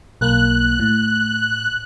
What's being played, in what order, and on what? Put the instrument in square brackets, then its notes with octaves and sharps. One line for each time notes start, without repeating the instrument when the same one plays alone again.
[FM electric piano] B1 A#3 [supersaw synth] F#6
[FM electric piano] A2